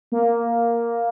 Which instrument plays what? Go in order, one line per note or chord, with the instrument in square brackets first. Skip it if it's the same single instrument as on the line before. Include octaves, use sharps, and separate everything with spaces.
[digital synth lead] A#3